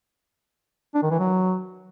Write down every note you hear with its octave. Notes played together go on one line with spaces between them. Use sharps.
D4
D#3
E3
F#3